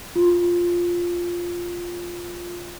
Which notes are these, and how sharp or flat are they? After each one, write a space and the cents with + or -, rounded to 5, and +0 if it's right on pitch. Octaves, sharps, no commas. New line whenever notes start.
F4 +0